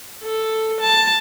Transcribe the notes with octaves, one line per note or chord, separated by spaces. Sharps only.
A4
A5